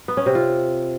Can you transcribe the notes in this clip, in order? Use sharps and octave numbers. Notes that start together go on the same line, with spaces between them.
B3
C#4
C3
F4